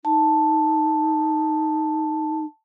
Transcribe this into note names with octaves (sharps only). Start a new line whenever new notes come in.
D#4 A5